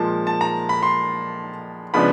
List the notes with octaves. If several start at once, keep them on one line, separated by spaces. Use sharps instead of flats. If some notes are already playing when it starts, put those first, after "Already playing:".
Already playing: A#2 F3 G#3 A5
A5
A#5
B5
C6
C#3 F3 G#3 B3 D4 B5